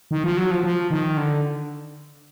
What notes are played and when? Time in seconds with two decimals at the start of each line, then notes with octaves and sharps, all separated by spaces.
0.11 D#3
0.24 F3
0.37 F#3
0.51 F3
0.64 F3
0.90 D#3
1.17 D3